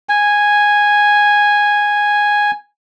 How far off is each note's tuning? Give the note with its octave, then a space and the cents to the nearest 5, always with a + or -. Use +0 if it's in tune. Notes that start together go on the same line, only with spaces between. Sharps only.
G#5 -5